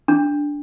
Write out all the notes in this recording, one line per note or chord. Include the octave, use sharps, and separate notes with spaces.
D4